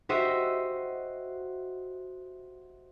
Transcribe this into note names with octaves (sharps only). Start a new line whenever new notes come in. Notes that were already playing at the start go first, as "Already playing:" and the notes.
F#4 G4 C5 D#5 E5